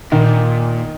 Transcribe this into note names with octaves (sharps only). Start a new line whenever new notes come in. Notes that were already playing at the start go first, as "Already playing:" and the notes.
A#2 D#3